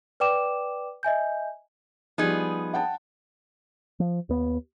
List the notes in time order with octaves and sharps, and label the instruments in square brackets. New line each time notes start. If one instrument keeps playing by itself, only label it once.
[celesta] B4 D5 G5 D6 E7
D#5 E5 G#5 G6
[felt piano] F3 G3 [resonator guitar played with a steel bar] B3 D#4 G#4
[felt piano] F#5 G5 A5
[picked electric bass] F3
D#2 B3